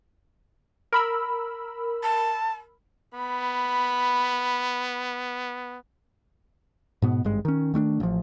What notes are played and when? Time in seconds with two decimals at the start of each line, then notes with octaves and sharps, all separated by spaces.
0.93 A#4 B5 E6
2.03 A5
3.14 B3 B5
7.02 G#2 B2 B3
7.25 G#1 G2 G#3
7.45 D#3 C#4
7.74 D#3 A3 C#4 D4
8.00 A1 F3